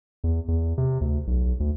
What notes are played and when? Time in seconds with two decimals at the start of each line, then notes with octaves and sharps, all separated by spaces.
0.24 E2
0.48 E2
0.78 C3
1.01 D2
1.27 B1
1.60 D2